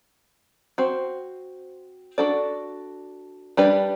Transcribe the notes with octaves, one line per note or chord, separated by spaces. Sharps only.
C4 F#4 C5
D4 F#4 A4 D5
G3 D4 G4 B4 D5